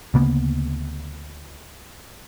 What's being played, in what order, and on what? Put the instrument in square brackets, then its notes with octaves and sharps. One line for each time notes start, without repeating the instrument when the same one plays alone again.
[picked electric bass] D2 C#3 A#3 B3